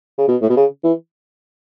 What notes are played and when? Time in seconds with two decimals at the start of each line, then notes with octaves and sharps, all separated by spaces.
0.18 C#3
0.28 B2
0.42 A2
0.49 B2
0.57 C#3
0.84 E3